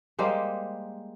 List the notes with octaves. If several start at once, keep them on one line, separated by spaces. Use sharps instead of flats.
G3 G#3 A#3 C5